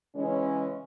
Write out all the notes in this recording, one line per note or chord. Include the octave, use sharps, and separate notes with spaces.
C#3 E3 G#3 C#4